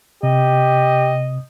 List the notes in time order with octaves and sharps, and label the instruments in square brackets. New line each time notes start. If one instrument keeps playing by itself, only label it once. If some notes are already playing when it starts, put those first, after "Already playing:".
[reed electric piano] C3 [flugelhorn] G4 [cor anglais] D#5